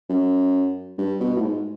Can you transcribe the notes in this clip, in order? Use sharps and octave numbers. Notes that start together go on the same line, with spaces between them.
F#2
G2
B2
A2
G#2